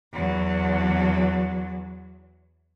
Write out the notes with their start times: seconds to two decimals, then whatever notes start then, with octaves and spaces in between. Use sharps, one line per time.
0.13 E2 F#3